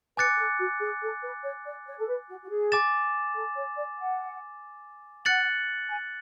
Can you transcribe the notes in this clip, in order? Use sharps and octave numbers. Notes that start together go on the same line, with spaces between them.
B4 G#5 D6 F#6 A6 C#7
A4
F#4
G#4
A4
B4
C#5
D5
C#5
A4
B4
F#4
F#4
G#4
G#5 D6 A6 E7
A4
C#5
D5
F#5
F#5 F#6 A6 C#7 F#7
G#5